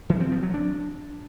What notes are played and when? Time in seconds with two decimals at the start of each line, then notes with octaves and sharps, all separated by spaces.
0.10 E3
0.21 C4
0.32 F3
0.43 F#3
0.54 D4